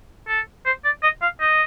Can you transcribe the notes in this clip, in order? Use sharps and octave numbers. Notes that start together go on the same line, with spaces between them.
A4
C5
D5
D#5
F5
D#5